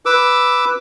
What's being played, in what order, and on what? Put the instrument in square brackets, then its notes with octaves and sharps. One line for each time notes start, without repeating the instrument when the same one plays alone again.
[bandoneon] B4 D6 E6